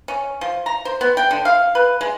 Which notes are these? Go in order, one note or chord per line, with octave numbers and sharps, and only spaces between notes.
C#4
F3
A#5
C5
B3
G5
D3
F5
B4
G#3